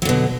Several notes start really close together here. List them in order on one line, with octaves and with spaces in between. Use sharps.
F#3 D3 B2